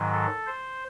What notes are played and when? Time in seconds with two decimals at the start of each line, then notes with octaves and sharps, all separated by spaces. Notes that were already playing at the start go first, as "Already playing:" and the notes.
Already playing: G#2 D#3 F#3
0.12 A4
0.47 C5